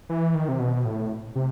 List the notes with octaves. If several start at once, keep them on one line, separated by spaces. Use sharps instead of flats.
E3
D#3
C3
B2
A2
C3